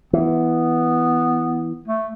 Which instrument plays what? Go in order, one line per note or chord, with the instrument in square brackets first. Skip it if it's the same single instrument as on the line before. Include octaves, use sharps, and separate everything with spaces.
[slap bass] E3 [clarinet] B3
[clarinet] A3